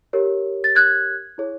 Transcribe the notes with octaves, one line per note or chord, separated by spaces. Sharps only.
G4 A#4 C#5
A6
F#6 G#6
E4 G#4 C#5